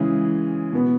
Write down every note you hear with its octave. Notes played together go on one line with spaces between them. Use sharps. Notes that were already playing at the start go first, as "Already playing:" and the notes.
Already playing: C#3 E3 G#3 G#4
B2 B3